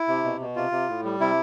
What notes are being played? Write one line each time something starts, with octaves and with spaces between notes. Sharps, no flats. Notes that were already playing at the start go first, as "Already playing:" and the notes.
Already playing: E4
C3
B2
B2
C3 F4
C3
A2
G3
C3 E4